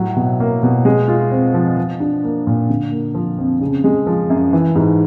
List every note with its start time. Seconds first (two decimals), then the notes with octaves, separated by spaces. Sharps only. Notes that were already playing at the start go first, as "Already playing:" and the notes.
Already playing: A2 F#3
0.16 B2
0.40 A#3
0.63 B2
0.85 G#3
1.08 F4
1.31 C4
1.54 F3
1.77 F3
2.00 D4
2.24 A#3
2.47 A#2
2.70 D3
2.92 A#3
3.15 F3
3.38 F2
3.61 C#3
3.84 G#3
4.07 F3
4.30 F#2
4.53 E3
4.75 G#2